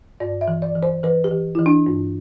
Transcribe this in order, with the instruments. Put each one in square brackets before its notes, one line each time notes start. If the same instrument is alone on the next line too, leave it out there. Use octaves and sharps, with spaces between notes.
[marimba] G2 D5
E5
E3
D5
E3
C5
E3 B4
G4
E3
E3 E4
D4
G2